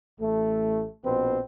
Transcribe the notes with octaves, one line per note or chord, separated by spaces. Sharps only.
A1 A3
A#1 B2 C4 B4 C5